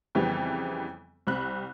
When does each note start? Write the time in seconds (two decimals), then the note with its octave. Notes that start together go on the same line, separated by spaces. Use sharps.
0.15 F2 C#3 E3 G3 B3 C4
1.27 C2 C4 B5 F#6